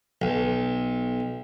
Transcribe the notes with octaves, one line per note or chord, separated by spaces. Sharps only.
B1